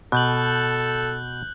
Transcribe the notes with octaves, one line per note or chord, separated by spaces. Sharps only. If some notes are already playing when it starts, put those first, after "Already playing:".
B2 A4 F#6 G6 F#7